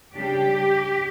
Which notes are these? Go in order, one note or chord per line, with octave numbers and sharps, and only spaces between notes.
C#3 G3 D4 G4